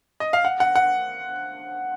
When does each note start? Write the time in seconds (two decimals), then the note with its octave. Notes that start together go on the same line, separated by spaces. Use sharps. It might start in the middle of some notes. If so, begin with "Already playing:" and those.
0.20 D#5
0.33 F5
0.45 F#5
0.60 F#5
0.76 F#5